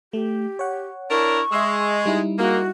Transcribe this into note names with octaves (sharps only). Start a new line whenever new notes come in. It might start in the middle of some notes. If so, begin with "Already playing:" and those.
A3 G4
C#5 F#5
D4 E4 A#4 C#6
G#3 E5 C6 E6
G3 D#4 E4
G#3 A#3 F#4